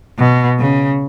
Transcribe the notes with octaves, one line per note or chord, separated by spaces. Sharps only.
B2
C#3